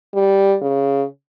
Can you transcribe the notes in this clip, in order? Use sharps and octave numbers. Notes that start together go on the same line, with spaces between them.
G3
C#3